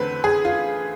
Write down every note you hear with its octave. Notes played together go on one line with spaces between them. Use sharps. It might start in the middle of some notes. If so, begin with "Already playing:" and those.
Already playing: E2 D3 A3 C4 B4
G#4
F4